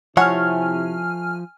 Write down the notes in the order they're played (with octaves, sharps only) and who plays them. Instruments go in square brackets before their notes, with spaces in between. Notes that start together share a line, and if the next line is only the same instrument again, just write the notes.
[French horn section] C3 E4 [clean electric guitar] F3 [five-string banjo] A3 C#5 F#5 [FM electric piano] G#5 F6